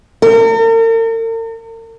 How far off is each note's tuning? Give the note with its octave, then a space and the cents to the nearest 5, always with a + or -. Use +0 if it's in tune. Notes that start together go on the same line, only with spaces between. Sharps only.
A#4 -45